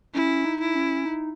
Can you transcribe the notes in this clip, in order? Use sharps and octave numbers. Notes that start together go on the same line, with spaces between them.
C#4 E4
D#4
E4
C#4
D#4